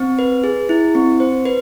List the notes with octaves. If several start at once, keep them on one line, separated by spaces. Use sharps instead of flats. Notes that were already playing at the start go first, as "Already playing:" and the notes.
Already playing: C4
B4
G#4
E4
C4
C5
B4